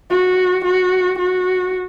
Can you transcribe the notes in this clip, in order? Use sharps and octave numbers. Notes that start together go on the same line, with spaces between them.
F#4
F#4
F#4